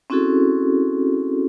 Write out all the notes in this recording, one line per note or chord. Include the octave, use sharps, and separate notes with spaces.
C4 C#4 E4 F#4 G#4 A4